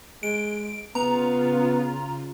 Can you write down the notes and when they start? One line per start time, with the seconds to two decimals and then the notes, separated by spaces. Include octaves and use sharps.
0.23 G#3 D7
0.95 C#3 B3 F4 A#5